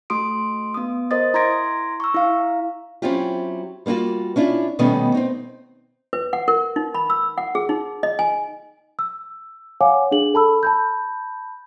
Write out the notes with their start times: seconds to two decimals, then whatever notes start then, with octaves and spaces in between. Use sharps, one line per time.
0.10 A3 F#4 C6 D#6 D7
0.74 B3 D#6
1.11 A#4 C5 D#5 D#6 A6
1.34 E4 A#5 C6 G#6 A#6 D7
2.00 C#6 E6
2.15 E4 F5
3.02 F#3 C4 C#4 E4 F4 G4
3.86 G3 A#3 D#4 F4 F#4
4.36 C#4 D4 E4 F4
4.79 B2 D#3 G3 A3 B3 C#4
5.14 C4 D#4
6.13 B4
6.33 F#5
6.48 A#4
6.76 D#4
6.95 B5
7.10 E6
7.38 F#5
7.55 G#4
7.69 D#4
8.03 D#5
8.19 G#5
8.99 E6
9.81 C#5 F5 F#5 G#5 D6
10.11 D4 G#4 F#7
10.34 A4 A5 B5 E6
10.63 A5 B5 G6